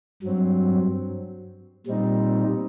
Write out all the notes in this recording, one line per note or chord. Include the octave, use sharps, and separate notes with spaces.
G2 F#3 C4
A#2 G3 C4 D#4